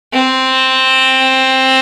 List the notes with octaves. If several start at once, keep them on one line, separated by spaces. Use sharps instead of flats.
C4